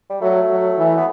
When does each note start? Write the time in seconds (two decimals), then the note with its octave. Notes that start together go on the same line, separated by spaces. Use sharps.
0.10 G3
0.21 F#3 A3
0.50 F#3
0.78 E3
0.97 B3